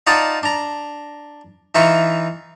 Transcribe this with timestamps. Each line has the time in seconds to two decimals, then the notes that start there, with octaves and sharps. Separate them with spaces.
0.07 D#4 F4 D5 F#5 A5 D#6
0.43 D4 A#5
1.75 E3 D#4 F4 E5 C#6